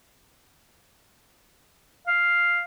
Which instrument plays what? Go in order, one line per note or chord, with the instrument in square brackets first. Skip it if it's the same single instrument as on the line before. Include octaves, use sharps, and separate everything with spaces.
[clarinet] F5